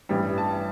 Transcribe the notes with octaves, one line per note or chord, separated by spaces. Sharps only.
A1 G2 E3 G3
A5